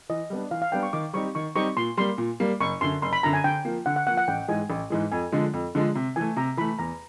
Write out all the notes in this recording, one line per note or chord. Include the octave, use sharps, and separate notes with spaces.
E3 D#5
G3 B3 D4
E3 F5
F5
G3 B3 D4 G5
C#6
D#3 D6
G3 C4 D#4 G4 C#6
D#3 C#6
G3 C4 D#4 G4 C#6
A#2 C6
G3 A#3 C6
A#2
G3 A#3
F#1 C#6
F#2 D3 C6
F#1 C6
B5
F#2 D3 A#5
G#5
D3 G5
F3 A#3
D3 F#5
F#5
F3 A#3 F#5
F#5
A1 G5
G#2 E3 G#3 G#5
A1
G#2 E3 G#3
F2 G#5
D3 F3 G#3
F2
D3 F3 G#3
C3
E3 A3 G#5
C3 A#5
E3 A3 B5
E2 A#5